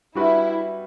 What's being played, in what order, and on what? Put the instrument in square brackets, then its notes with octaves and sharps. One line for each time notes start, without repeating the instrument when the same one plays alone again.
[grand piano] G3 D4 F#4 B4 [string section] E4